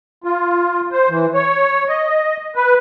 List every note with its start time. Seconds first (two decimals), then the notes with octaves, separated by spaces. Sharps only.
0.24 F4
0.92 C5
1.09 E3
1.34 C#5
1.88 D#5
2.56 B4